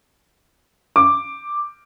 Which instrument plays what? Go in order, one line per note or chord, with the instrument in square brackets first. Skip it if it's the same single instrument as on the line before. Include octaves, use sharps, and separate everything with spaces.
[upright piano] D6